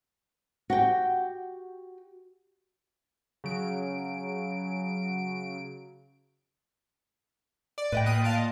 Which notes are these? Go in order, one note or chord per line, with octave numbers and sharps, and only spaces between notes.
F#4 G4 G5
C#3 F#3 D7
D5
A2 B4 D#5 G5
A#2 A#3 D#6 F#6
F5 A5 D7
D#5